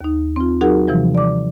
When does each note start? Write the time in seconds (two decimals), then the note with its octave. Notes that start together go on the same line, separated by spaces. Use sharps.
0.01 D#2 D#4
0.36 C4 F4
0.61 F#3 D#4 F#4 G#4 A#4 F#5
0.87 C3 E3 F3 G3
1.15 D5 D6